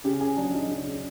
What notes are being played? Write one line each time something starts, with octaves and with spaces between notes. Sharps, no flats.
C#3 G4
C#3 G#4
F#3 D4
F#3 D#4
C#3
C#3